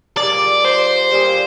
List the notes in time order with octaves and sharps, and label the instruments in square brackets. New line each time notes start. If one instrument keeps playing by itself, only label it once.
[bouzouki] G3 A#3 F4 G#4 [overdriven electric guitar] D5
[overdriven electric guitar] C5
[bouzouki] G3 A#3 F4 G#4